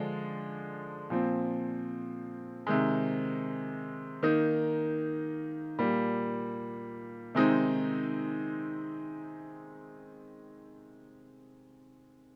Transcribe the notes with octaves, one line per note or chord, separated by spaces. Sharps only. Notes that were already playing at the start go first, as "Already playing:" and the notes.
Already playing: D3 F3 G#3 D4
A#2 F3 C4
C3 D#3 G#3
D#3 A#3 D#4
A#2 G3 A#3
C3 D#3 G#3 C4 D#4